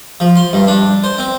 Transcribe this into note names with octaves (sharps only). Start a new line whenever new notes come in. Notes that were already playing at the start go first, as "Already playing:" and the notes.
F3
C6
G2
D4
C5
C4